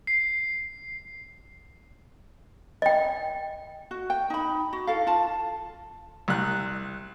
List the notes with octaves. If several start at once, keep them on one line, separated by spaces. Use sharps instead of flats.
C7
D#5 G5
F#4
G5
D#4 B5
F#4
E4 A4 F5
F4 A5
C2 F#6